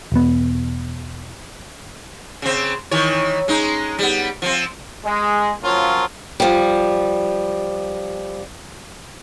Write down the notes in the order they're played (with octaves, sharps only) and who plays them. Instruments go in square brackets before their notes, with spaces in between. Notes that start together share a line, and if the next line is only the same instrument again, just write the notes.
[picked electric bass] E1 B3
[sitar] C#3 C4
D#3 E3 C#5
G#3 C#4 D#4
G3 B3
F3 C4
[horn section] G#3
F3 F#3 A#3 C#4 F4
[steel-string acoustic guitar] F3 G3